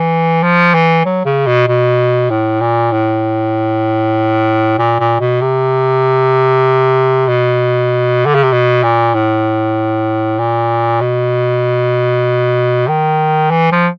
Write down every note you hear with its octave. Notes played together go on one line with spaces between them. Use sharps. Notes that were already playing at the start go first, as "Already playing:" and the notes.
Already playing: E3
F3
E3
F#3
C#3
B2
B2
A2
A#2
A2
A#2
A#2
B2
C3
B2
D3
C#3
C3
B2
A#2
A2
A#2
B2
D#3
E3
F3